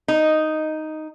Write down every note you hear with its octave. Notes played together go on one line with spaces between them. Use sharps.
D#4